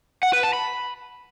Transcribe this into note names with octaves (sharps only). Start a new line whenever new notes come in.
F#5
B4
A5
B5